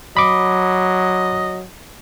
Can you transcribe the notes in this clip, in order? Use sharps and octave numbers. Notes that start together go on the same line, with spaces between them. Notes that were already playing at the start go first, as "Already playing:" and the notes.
F#3 D#5 B5 D6